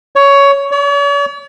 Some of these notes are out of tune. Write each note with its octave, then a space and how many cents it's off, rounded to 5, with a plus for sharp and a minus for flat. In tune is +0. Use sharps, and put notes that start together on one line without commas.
C#5 +15
C#5 +45